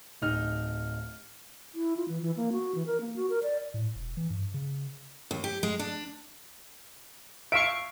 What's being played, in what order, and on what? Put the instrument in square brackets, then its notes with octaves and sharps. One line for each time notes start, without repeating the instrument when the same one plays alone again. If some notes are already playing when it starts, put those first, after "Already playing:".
[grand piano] D1 D#4 F6
[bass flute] E4
F4
E3
E3
A#3
F#4
E3
A#4
A#3
F#4
A#4
D5
[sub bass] A2
E1
E3
G2
C#3
[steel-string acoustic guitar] D#2
G4
G#3
D4
[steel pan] E5 F5 C#6 [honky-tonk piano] D7